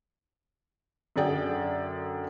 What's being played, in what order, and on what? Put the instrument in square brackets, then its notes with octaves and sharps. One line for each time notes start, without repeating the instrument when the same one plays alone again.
[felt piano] F#2 D3 G#4 D5 G5